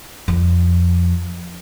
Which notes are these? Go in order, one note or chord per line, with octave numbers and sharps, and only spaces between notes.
F2